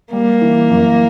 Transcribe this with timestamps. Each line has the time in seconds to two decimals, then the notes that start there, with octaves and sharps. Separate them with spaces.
0.12 G3 A#3
0.42 E3
0.70 F#2